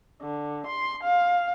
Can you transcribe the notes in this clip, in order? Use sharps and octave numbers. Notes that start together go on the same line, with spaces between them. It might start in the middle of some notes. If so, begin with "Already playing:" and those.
D3
C6
F5